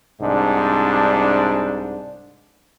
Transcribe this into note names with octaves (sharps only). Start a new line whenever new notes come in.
C2 G#2 D4